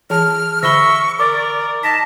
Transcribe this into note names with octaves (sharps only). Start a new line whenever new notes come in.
E3 G#4 A5 F6
D3 E5 B5 C#6 A#6 G7
A#4 D5 D6
D#4 A5 A#6 B6